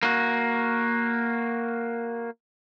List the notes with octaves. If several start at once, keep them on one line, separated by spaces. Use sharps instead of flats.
A#3 F#4